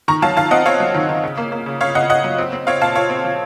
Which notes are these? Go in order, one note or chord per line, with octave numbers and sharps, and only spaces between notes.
D#3 A#5 C#6
F#3 F5 A5
D#3 F5 A5
C4 D#5 F#5
C4 C#5 F5
F#3
D#3
D#3
C#3
A#3
A#3
C#3
C#3 C#5 F5
C#3 D#5 F#5
C#3 D#5 F#5
F#3
C4
C4
C4 C#5 F5
A#2 F5 A5
A#2 C#5 F5
C4
F3